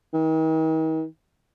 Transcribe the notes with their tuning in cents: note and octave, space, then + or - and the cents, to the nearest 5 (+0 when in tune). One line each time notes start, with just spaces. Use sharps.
D#3 +40